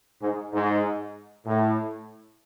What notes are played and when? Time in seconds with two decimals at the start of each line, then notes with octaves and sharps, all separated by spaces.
0.21 G#2
0.53 G#2
1.46 A2